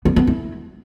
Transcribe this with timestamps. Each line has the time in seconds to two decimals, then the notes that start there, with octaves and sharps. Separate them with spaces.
0.05 B3
0.16 B3
0.27 E4